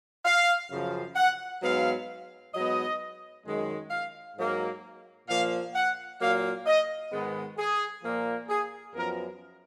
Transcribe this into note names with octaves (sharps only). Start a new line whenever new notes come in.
F5
F#2 C#3 F3
F#5
G#2 F#3 B3 F5
G#2 F#3 B3 D#5
F#2 D#3 G#3
F5
G#2 F#3 A#3
A#2 F3 A#3 F5
F#5
A#2 F#3 A#3 F5
D#5
G#2 D#3 G#3 B3
G#4
A#2 F3 A#3
G#4
F#2 F3 B3 A#4